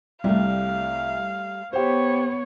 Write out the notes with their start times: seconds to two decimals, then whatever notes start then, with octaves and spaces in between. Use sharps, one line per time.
0.24 C2 G3 A3 F5
1.73 B3 G4 C5 C#5